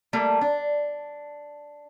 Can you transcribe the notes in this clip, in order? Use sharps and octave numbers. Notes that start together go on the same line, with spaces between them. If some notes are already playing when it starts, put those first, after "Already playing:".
G3 A3 A#3
D4